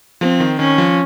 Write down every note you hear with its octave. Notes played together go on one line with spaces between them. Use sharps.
F3 C4
D#3
D#3 C#4
F3